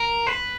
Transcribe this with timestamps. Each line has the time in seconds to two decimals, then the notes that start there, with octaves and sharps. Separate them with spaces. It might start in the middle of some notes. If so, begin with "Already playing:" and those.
Already playing: A#4
0.27 B4